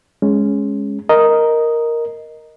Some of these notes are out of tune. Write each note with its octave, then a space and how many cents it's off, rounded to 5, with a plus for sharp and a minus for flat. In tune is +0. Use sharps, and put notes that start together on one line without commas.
G#3 +0 C#4 +0
A#4 +0 D#5 +0